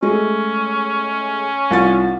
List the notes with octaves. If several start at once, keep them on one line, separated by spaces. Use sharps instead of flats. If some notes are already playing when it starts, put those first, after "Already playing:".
G#3 A3 C#4
C2 F4 A6